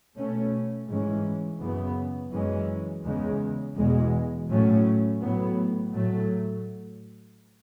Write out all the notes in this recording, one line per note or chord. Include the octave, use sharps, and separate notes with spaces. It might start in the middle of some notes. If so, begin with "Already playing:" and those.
B2 A3 C#4
G#2 E3 G#3 C#4
F#2 C#3 E3 B3
F#2 E3 G#3 C#4
E2 C#3 G#3
E2 B2 G#3
A2 F#3 A3 C#4
A2 F#3 B3
A2 F#3 A3